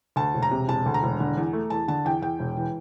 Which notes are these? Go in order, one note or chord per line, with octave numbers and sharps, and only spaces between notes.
D2 A5
E1
A#5
C3
E1 A5
D2
A#5
E1
D3
E2
A3
E2 A5
D3 A5
E2 G5
E2 G5
E1
E3